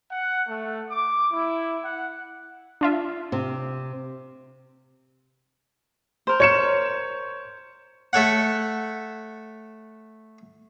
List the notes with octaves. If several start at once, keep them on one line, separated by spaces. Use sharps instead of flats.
F#5
A3
D6
E4
F#5
D4 F4 E5
C3
A#4 C5
C#5 C#7 E7
A3 A4 C#5 F#5